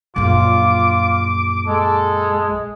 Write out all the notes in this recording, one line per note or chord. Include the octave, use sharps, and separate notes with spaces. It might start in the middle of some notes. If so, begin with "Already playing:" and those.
A#1 F#2 F4 D6
G#3 A4